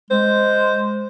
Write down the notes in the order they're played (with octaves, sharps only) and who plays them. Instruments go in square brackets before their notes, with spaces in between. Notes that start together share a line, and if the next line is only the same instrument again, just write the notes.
[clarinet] G#3 [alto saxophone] C5